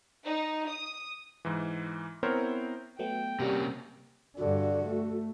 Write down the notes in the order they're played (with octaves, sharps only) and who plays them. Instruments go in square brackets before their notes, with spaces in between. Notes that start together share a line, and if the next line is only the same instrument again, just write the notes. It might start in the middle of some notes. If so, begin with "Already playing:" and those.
[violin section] D#4
D#6
[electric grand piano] G#2 E3
B3 C4 E4 A#4 C5 C#5
[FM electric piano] F#3 A3 B3 [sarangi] G5
[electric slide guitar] C3 A#3 C#4 [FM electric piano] G3 F#4 G4
[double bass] G2 D3 [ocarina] F#4
[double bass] A3